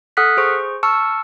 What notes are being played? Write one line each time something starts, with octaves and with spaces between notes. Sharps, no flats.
A4 F#5 D#6 F6 F#6 B6
G#4 C5 C#6
A5 C#6 E6 F6 C#7